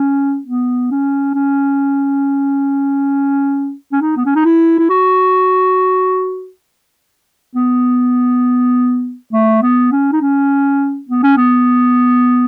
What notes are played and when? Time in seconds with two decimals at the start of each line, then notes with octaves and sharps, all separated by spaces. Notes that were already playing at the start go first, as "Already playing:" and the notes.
Already playing: C#4
0.47 B3
0.91 C#4
1.34 C#4
3.92 C#4
4.01 D#4
4.17 B3
4.26 C#4
4.36 D#4
4.45 E4
4.79 E4
4.90 F#4
7.56 B3
9.33 A3
9.62 B3
9.92 C#4
10.13 D#4
10.21 C#4
11.09 B3
11.23 C#4
11.37 B3